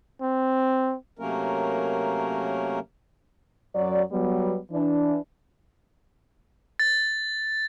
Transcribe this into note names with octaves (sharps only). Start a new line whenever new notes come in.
C4
C3 F#3 A3 A#3 C#4 A#4
F#2 F#3 D5
F#3 G3 B3
E3 D4
A6